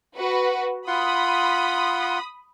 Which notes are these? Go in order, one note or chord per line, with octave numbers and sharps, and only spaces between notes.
F#4 B4
F4 F#5 B5 C6 D#6